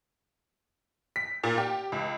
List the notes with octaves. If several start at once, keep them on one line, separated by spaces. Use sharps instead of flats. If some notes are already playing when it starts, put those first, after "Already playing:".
B6
A#2
G4
C#2